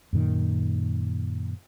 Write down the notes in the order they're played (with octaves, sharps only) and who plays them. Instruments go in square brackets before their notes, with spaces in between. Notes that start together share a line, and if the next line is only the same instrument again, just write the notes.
[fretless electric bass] F#2 A#2 D#3